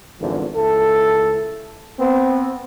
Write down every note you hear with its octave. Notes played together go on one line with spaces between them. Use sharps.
G#1 E2 D3 F3
C#2 E4 A4
B3 C4